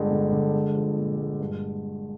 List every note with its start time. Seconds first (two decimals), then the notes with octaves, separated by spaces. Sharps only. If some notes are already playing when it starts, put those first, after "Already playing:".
Already playing: G1 D3 G#3
0.11 D3
0.32 D3
0.54 G#3
0.75 F3
0.97 A#2
1.18 G#3
1.40 G2